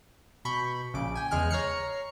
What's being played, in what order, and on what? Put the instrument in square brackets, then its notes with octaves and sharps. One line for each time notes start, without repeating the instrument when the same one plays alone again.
[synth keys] B2 B5 C#6 G6
A#1 C#3 D6 D7
G5 G#5
E2 C#3 G#3 G#5 F6 F#6
C#5 A#5 F6 C7 C#7